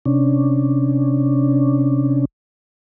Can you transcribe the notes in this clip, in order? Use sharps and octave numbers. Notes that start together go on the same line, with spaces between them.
C3 C#4 D4